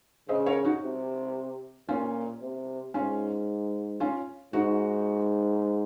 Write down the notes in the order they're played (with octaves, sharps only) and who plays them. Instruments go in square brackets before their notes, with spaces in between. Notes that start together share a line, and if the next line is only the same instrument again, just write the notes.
[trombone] C#3 [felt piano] C5 D#5
[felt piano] A#4 C#5
D#4 F#4
[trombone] C3
[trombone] A#2 [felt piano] C#4 F4
[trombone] C3
[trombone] G#2 [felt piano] C#4 F4
[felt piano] C#4 F4
[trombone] G#2 [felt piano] D#4 F#4